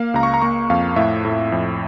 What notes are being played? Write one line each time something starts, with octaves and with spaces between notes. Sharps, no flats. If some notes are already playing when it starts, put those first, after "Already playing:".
Already playing: A#3 F5
C#2 A#5
C#6
A#5
A#3 C#6
F2 F5
A2 E5
A2
F2